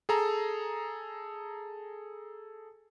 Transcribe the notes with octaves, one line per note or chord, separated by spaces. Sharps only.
G#4 A4 A#5